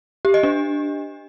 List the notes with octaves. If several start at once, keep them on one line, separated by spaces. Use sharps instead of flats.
G4
D#5
D4